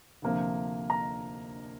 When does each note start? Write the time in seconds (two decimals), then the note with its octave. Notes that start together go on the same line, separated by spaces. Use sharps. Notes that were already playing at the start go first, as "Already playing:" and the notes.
0.22 D2 C3 F3 A#3
0.90 A#5